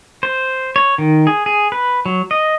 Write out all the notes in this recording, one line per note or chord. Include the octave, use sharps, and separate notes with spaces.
C5
C#5
D#3
G#4
G#4
B4
F#3
D#5